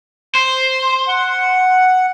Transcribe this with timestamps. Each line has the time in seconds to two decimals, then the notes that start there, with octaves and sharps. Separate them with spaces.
0.35 C5 C6
1.08 F#5